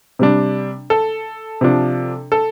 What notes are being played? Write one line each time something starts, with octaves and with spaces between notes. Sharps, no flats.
C3 G3 D4
A4
C3 F3 D4
A4